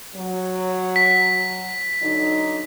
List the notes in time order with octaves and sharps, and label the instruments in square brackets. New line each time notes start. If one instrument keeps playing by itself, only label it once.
[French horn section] F#3
[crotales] B6
[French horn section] D3 F#3 D#4